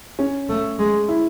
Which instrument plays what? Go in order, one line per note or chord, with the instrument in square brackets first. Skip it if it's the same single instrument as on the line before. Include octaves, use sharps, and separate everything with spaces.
[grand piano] C#4
[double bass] A3
G#3
[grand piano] E4